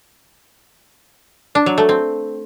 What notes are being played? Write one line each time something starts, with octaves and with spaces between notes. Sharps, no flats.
D4
F#3
A3
C4